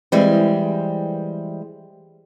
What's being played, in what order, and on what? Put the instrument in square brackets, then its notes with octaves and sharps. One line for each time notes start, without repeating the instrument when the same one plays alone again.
[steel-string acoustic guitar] E3 G3 G#3 C4